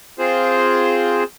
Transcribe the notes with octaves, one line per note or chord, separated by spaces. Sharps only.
C4 F4 G#4 C5